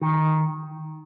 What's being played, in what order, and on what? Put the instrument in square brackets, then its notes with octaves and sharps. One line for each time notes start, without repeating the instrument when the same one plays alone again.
[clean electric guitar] D#3